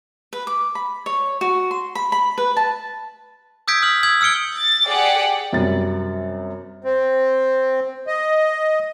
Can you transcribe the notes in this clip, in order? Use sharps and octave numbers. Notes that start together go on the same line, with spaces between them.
B4
D6
B5
C#5
F#4
C6
B5
B5
B4
A5
D#6 E6 G6 G#6 B6 D7
D#6 F6 G6 F#7
D#6 E6 G#6 F#7
E6 F6 C#7 D7 G7
A6
G4 G#4 D5 F#5 G5
F#2 C3 G3 A6
C4
D#5